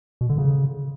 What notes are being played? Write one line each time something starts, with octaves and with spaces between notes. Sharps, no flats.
B2
D3
C#3